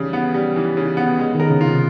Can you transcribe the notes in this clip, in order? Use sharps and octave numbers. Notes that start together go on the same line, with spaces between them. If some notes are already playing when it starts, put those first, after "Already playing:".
Already playing: C#3 E3 G3
B3
G3
E3
C#3
B3
G#3
D#3
A#4
C#3
C3 F4